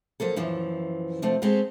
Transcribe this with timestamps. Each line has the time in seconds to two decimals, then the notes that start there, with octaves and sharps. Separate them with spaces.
0.20 F3 F#3 A#3 A4
0.36 F#2 A#2 E3 F3
1.22 C3 F3 A3 C4
1.42 G#3 C4 F#4 G4 A4